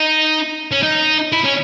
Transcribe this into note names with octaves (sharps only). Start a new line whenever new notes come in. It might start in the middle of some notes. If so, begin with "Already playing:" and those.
Already playing: D#4
C#4
D#4
E4
C#4